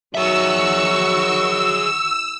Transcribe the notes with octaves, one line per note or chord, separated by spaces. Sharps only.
D#3 F#3 F#4 G#4 E5 C#6 E6